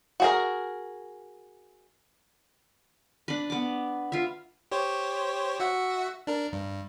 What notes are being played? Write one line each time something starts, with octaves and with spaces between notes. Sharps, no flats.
F#4 G#4 A#4
D4 B4
B3 D6
F4 E5
G4 C5 C#5
F#4 E5 F#5
D4 A#4
G2